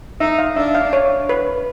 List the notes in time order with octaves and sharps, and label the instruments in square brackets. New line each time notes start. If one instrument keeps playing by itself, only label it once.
[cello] D#4 [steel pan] E5
[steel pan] F5
[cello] D4 [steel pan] E5
[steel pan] F5
C#5
B4